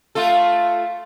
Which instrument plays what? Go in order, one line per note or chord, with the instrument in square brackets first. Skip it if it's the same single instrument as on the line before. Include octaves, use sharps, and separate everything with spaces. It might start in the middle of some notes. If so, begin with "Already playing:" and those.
[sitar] A3 F4 A4